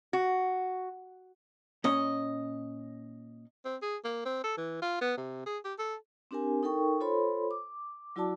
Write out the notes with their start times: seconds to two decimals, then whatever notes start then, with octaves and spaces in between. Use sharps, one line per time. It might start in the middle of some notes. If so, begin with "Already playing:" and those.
0.13 F#4
1.84 A#2 C#4 C#5 D#5
3.65 C4
3.82 G#4
4.04 A#3
4.25 C4
4.44 A4
4.57 E3
4.82 F4
5.01 B3
5.17 C3
5.46 G#4
5.65 G4
5.79 A4
6.31 C4 D4 G4 A#4 G#5
6.63 D#4 A4 A#4 G5 C#6
7.01 F4 A4 C5 C#5 B5 C6
7.51 D6
8.16 F#3 E4 F#4 D5 A5 D6